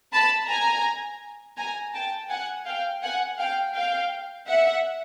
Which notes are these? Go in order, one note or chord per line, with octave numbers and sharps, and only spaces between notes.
A5 B5
G#5 A#5
G#5 A#5
G5 A5
F#5 G#5
F5 G5
F#5 G#5
F5 G5
F5 G5
E5 F#5